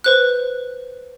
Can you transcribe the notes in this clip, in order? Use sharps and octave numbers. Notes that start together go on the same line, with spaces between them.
B4 C5 F#6